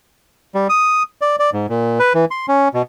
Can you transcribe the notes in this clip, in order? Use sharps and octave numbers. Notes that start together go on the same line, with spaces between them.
G3
D#6
D5
D5
G#2
A#2
B4
E3
C6
C#4
B2